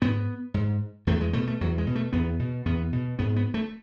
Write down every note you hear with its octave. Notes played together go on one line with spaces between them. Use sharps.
G#2 B3
G#2
E2 A3
G#3
B2 A3
A3
E2 F#3
G#3
B2
A3
E2 B3
B2
E2 B3
B2
G#2 B3
B3
A3